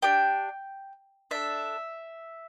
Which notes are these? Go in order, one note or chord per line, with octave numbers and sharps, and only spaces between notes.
D4 G4 G5
D4 A4 E5